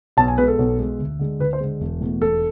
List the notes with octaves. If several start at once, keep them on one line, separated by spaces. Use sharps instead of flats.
B1 A5
G#5
B2 G#3 B4
A4
B1
B2 G#3
D2
D3 G#3
D2 B4
C5
D3 G#3
E1
E2 B2 A3
E1 A4